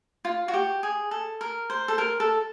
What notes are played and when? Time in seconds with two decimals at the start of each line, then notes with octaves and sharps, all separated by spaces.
0.25 F4
0.48 F#4
0.54 G4
0.83 G#4
1.11 A4
1.41 A#4
1.70 C5
1.88 A4
1.98 A#4
2.20 A4